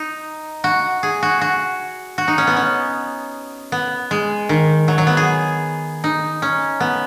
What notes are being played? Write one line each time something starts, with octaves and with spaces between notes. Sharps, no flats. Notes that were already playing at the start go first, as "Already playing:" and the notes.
Already playing: D#4
F#4
G#4
F#4
F#4
F#4
D#4
C#4
B3
C#4
B3
G#3
D#3
F#3
F#3
B3
G#4
D#4
C#4
B3